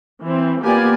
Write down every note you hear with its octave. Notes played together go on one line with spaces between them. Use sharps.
E3 C4
A#3 B3 F4 G4 D5 G#5